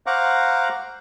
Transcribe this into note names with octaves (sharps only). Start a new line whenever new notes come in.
C5 F5 F#5 A#5 C#6 D6